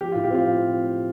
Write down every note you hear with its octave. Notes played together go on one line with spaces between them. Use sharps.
F3 G4
F4
A2
G4
C4 F4